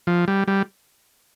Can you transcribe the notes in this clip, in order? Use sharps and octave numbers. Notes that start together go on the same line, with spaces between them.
F3
G3
G3